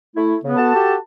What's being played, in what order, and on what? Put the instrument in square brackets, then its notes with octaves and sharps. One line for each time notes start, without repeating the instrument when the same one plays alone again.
[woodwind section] A3 E4
[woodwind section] C#3 [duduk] B3
[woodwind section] F#4 A4 A5
[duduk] G4